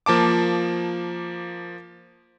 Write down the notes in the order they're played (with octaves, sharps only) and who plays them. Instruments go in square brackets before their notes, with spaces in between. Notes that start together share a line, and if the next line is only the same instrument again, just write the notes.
[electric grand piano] F3 A#3 A5 D6